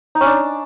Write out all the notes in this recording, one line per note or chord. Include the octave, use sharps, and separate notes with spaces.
D#4
C#4
D4